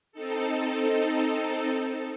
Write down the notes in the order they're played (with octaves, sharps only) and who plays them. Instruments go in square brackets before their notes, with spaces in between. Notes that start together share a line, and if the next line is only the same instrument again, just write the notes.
[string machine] C4 D#4 A4